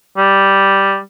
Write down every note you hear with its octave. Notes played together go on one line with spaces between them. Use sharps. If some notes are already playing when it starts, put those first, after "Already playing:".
G3